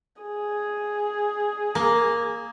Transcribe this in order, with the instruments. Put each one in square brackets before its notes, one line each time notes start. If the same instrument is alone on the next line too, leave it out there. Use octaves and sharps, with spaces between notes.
[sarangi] G#4
[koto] A#3